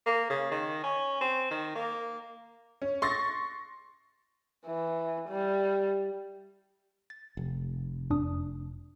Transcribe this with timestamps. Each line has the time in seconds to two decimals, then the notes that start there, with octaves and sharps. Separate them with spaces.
0.06 A#3
0.30 C#3
0.52 D#3
0.84 C#4
1.21 C4
1.51 D#3
1.76 A#3
2.82 C#4
3.02 C6 C#6 A6 A#6
4.66 E3
5.29 G3
7.10 A6
7.37 F1
8.10 F2 D4 D#6